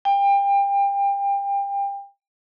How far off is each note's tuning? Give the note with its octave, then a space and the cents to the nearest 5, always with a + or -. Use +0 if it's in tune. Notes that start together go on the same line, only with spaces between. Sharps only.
G5 +30